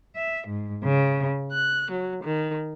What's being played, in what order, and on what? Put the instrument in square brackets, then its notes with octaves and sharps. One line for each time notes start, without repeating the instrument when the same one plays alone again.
[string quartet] E5
G#2
C#3
F#6
F#3
D#3